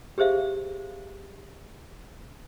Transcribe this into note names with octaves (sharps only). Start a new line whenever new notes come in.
G4 G#4 C5 E5 F5